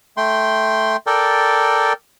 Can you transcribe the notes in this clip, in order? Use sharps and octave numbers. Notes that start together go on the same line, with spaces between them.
A3 G5 C6
A4 A#4 D5 G5